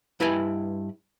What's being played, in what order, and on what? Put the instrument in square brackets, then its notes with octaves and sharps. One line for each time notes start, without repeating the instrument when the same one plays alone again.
[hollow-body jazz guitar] G2 E4 B4 G5 G#5